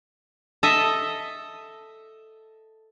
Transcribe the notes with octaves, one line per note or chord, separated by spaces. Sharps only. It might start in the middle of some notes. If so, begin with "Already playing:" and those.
A4 D#5 E5